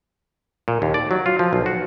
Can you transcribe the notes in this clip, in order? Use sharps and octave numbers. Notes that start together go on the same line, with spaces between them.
A#2
D#2
D5
F#3
F4
F3
B1
F#4